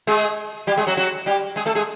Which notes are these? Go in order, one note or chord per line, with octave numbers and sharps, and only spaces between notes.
G#3 G#4
G3 G4
G#3 G#4
F#3 F#4
F#3 F#4
G3 G4
G#3 G#4
A3 A4
G#3 G#4